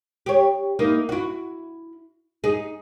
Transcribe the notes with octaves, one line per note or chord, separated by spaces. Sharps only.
G4 C#5
A#3 D#4 E4
E4 F#4
D#4 G#4